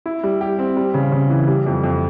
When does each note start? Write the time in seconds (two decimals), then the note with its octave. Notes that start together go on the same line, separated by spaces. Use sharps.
0.06 E4
0.23 G3
0.41 G4
0.59 C4
0.77 G3
0.94 C#3
1.12 C#3
1.30 E3
1.48 G3
1.66 F2
1.84 F2